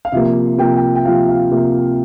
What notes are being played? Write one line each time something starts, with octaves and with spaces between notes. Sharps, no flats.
F5
C3 F3 A#3 E5
C3 F3 A#3 G5
G5
G5
C3 F3 A#3 F5
F5
C3 F3 A#3 E5